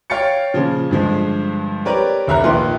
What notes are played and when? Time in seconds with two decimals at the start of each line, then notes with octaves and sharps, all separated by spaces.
0.10 C#5 F5 G5 A6 C#7
0.54 A#2 C#3 F3
0.91 G2 D3 F3 G#3
1.85 C4 G4 A#4 B4 C#5 D5
2.27 F1 D3 E5 F5 A#5 F#6
2.44 A#1 A#2 D#3 A#4 B4 C6